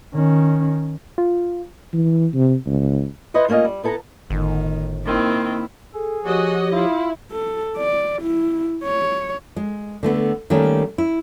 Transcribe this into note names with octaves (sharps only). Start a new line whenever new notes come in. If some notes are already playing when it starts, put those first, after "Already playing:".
D#3 C#4
F4
E3
C3
C#2
E4 B4 C5 D#5 F#5
A3 A#3 C#4 F4 D#5
G3
B3 E4 A4 G5 A5 A#5
G1 A2 D#3
D#3 A#3 C4 E4
G#4 A4
F3 F#4 G4 C#5 D#5
E4 F4
A4
D5
E4
C#5
G#3
D3 A3 B3
D#3 G3 A3 A#3 C#4
E4